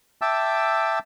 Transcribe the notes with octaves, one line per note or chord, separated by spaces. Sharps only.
E5 G5 A5 D6 E6